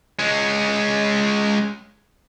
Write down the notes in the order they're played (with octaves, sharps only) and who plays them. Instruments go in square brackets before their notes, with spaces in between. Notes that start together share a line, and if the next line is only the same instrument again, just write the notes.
[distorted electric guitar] G#3 C#4